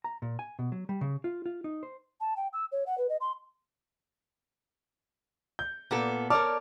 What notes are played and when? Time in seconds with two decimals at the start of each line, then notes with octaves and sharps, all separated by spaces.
0.04 A#5
0.22 A#2
0.39 G#5
0.59 B2
0.72 F#3
0.89 G3
1.01 C#3
1.24 F4
1.46 F4
1.64 D#4
1.83 C5
2.20 A5
2.36 G5
2.53 E6
2.72 C#5
2.86 F#5
2.98 B4
3.09 D#5
3.21 C6
5.59 G6
5.91 A#2 B3 A4
6.30 A#4 C#5 D5 A5 D6 F6